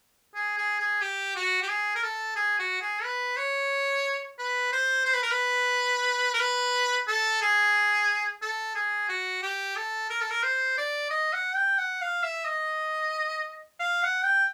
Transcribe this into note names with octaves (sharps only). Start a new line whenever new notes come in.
G#4
G#4
G#4
G4
F#4
G4
G#4
A#4
A4
G#4
F#4
G#4
B4
C#5
B4
C5
C5
B4
A#4
B4
A#4
B4
A4
G#4
A4
G#4
F#4
G4
A4
A#4
A4
A#4
C5
D5
D#5
F#5
G5
F#5
F5
E5
D#5
F5
F#5
G5